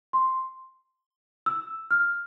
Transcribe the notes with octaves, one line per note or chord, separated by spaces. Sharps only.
C6
E6
F6